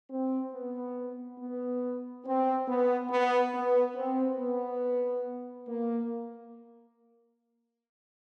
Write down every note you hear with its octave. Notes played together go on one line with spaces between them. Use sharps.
C4
B3
B3
C4
B3
B3
B3
C4
B3
A#3